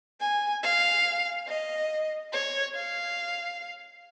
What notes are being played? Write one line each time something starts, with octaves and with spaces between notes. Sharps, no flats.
G#5
F5
D#5
C#5
F5